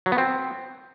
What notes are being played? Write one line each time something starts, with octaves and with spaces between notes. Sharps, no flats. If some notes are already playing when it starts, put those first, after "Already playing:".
F#3
B3
C4